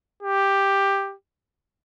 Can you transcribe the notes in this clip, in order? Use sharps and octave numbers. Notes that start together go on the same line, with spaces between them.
G4